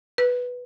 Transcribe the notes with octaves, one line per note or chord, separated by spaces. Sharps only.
B4